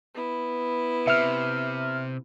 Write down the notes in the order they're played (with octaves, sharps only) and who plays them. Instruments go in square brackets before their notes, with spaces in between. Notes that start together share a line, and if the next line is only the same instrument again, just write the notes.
[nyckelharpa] B3 E4
[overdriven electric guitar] C3 [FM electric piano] E5 F6